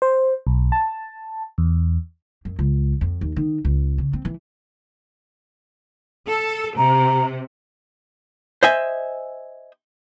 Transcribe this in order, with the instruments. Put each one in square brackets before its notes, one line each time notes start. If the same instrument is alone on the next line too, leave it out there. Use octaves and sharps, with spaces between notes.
[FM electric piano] C5
B1
A5
E2
[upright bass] F#2
C#2
F2
D#2
D#3
C#2
C#3
C4
E3
[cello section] A4
[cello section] C3 [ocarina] A#5
[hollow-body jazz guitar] C5 D#5 E5 G#5